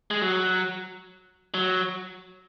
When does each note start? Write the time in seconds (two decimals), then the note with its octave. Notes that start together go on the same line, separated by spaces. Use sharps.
0.11 G#3
0.22 F#3
1.54 F#3